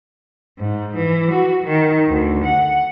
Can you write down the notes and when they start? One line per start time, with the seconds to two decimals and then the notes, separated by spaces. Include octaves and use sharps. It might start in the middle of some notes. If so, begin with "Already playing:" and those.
0.58 G#2
0.94 E3
1.32 F#4
1.65 D#3
2.09 D2
2.45 F#5